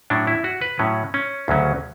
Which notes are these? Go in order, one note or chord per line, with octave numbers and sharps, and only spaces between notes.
A2 F#3 C#4 D4
E4
F#4
B4
A2 F#3 C#4
C#4
D2 C#3 F#3 C#4